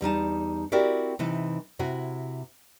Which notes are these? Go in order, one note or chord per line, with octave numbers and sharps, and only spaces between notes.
E2 G3 D#4 A5
C4 E4 F#4 G4 A#4 D5
C3 E3 D#4
C3 E4 F#4